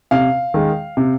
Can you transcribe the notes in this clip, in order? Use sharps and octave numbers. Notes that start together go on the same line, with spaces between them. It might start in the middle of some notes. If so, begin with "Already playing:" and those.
C3 F5
D#3 G#3
C3